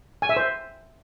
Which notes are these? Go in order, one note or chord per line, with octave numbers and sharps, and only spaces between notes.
G#5
E5
C5